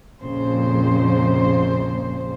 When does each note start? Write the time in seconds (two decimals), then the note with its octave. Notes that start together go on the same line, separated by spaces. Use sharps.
0.23 A#1 F2 A#2 C#3 C5